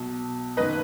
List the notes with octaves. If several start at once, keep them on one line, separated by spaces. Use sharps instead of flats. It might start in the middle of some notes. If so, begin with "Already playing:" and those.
Already playing: B1 B2
F#1 D#3 B4 D#5